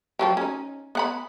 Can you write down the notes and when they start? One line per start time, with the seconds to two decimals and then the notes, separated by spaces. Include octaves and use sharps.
0.19 F3 F#3 G4
0.37 C#4 D#4
0.95 B3 F#5 B5